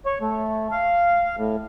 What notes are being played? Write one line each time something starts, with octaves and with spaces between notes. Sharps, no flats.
C#5
A3
F5
A2